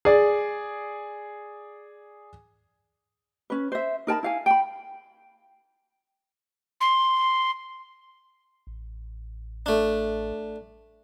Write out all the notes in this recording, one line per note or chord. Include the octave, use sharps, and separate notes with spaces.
G#4 D5
C#4 B4
C5 E5
D#4 A#4 A5 B5
E4 F5 G#5
G5 B5
C6
A1
A3 D4